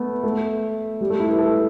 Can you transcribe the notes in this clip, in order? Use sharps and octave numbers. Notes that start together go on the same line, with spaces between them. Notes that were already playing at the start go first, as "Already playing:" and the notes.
Already playing: A3 B3
A3
G3
A3
E4
B4
A4